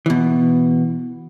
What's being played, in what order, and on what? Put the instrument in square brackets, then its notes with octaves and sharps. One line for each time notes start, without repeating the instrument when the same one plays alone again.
[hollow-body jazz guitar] B2 E3